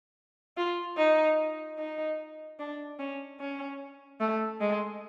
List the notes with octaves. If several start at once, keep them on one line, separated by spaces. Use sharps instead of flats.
F4
D#4
D#4
D4
C#4
C#4
A3
G#3